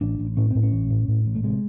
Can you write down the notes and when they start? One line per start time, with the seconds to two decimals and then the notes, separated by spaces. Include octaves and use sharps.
0.01 A1 D4
0.19 A1
0.37 A2 C#4
0.51 A2 C4
0.63 C#4
0.72 A1
0.90 A2
1.08 A2
1.26 A1
1.35 A3
1.43 C3 G#3